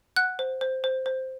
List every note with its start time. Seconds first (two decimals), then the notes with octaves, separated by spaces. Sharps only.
0.16 F#5 F#6
0.39 C5
0.61 C5
0.84 C5
1.06 C5